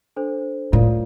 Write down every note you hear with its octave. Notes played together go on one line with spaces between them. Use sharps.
D4 A4 C5
A2 F4 A#4 D5 F5